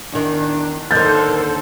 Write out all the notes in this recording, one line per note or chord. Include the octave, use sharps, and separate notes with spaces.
E2 D#3 D4
D#2 D3 A4 A#4 C5 G6 A6